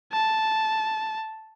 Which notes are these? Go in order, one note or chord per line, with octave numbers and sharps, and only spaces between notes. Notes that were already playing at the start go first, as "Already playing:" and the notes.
A5